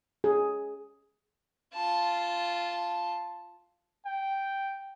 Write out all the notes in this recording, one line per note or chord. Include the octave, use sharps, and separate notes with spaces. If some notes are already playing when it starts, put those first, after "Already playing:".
G#4
F4 A5
G5